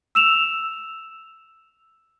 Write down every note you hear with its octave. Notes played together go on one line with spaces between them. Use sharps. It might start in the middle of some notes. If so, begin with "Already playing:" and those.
E6 E7 F7